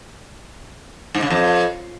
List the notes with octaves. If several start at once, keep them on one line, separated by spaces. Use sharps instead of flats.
G#2
C#3
F2